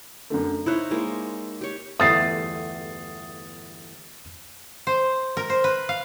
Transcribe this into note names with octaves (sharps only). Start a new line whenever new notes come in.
F#2 D3 A3
D#4 E4 C5 C#5 F#6
G#3 A#3 E4
G4 C#5
G1 E2 A3 D#6 A6 C7
C5
A#4
C5
B4
F5